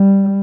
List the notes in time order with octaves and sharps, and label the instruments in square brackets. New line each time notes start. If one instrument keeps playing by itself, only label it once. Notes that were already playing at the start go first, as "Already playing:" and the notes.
Already playing: [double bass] G3